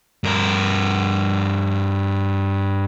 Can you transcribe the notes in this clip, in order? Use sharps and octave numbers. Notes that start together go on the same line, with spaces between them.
G2 A#4